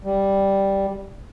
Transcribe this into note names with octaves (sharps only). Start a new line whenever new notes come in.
G3